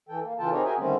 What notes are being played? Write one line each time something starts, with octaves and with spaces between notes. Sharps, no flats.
E3 A4 G5
A#3
C#3 E3 F4 A4 G5 A5
C4 D#4 G4 G#4 A#4 C#5
F#4 G#4 A#4 E5 G5 G#5
D3 D#3 G3 A3 C4 C#4